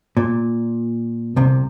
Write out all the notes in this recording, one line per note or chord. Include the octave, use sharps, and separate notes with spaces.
A#2
C2 C3